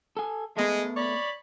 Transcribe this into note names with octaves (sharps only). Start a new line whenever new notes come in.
A4 G#5
G#3 A3 B3
C#5 D5 B5